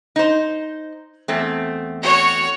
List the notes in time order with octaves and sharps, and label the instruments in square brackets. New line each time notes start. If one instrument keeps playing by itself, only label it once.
[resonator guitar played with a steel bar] D#4 C5
E2 A3 C4
[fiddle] F#4 C#5